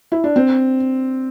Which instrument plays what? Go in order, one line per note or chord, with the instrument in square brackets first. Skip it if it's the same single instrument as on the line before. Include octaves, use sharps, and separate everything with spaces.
[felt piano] E4
D4
C4